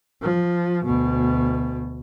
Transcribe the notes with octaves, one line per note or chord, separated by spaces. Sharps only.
F3
D2 B2